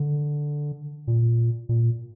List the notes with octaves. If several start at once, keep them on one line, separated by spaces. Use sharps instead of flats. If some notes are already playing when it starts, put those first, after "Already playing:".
Already playing: D3
A#2
A#2